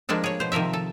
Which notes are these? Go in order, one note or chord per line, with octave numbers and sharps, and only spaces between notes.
F3 G#3 A#3 D4 A4
G#4 C#5
B2 C5
C3 D#3 F3 A#4 E5
A4